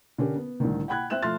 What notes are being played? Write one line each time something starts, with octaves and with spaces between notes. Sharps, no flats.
D3 C#4 G4 A#4
B3
C2 A2 D3 D#3
F#5 G5 B5 F#6 G#6
C4 E5 F#6 E7
F3 A3 E5 C6 F6 A6